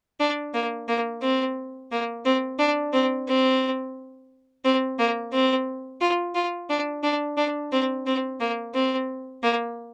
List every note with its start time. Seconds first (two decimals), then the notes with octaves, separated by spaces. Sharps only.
0.20 D4
0.54 A#3
0.88 A#3
1.22 C4
1.92 A#3
2.25 C4
2.59 D4
2.94 C4
3.28 C4
4.65 C4
4.99 A#3
5.33 C4
6.01 F4
6.35 F4
6.70 D4
7.03 D4
7.37 D4
7.72 C4
8.06 C4
8.40 A#3
8.75 C4
9.43 A#3